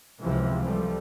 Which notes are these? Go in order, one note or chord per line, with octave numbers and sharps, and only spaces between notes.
C#2 C3 E3 F3
F3 G3 A3